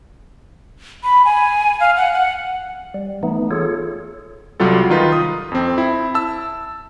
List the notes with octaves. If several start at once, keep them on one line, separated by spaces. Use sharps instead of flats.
B5
G#5
F5
F#5
F#5
G3
E3 A3 B3 D#4
F4 G#4 A4 C#5
C2 F#3 G3 F4 A4
D#3 D#4 F4 B4
D#6
F2 C4
E4
A5 E6